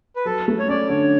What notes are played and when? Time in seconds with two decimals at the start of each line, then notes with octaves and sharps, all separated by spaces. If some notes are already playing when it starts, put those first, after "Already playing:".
0.16 B4
0.25 F#3 A4
0.48 A3
0.59 C#5
0.68 C#4 D5
0.90 D3 C#5